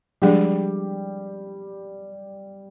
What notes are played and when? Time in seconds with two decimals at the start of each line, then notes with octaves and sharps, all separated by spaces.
0.22 F3 G3 G#3 D4 G4 G#4 D5